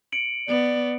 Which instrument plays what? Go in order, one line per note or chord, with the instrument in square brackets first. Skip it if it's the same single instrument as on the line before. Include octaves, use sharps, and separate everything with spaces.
[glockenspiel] C#7 D7 F#7
[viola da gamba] B3 [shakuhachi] D5